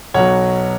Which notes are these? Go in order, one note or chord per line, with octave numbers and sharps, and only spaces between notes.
B1 B2 F#3 C#5 F#5